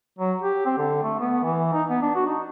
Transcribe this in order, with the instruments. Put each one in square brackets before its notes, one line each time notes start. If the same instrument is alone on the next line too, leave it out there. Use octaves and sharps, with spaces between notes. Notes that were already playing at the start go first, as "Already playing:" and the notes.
[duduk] F#3
G4
C4
D3
A3
B3
E3
D#4
B3
D4
F#4
D#4